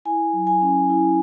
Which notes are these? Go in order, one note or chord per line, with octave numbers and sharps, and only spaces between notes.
E4 G#5
F#3
G#5
C#4
E4